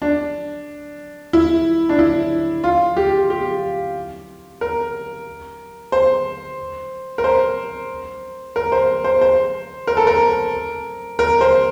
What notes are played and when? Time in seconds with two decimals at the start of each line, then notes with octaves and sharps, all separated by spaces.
0.02 D4
1.33 E4
1.89 D4
1.99 E4
2.64 F4
2.97 G4
3.30 G4
4.61 A#4
5.92 C5
7.18 A#4
7.24 C5
8.56 A#4
8.72 C5
9.04 C5
9.21 C5
9.87 A#4
9.97 A4
10.07 A#4
11.19 A#4
11.41 C5